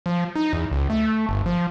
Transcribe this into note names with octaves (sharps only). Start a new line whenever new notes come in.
F3
D#4
E2
C#2
A3
G1
F3